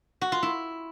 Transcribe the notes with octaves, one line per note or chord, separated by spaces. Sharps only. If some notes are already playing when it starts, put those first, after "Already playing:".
F#4
F4
E4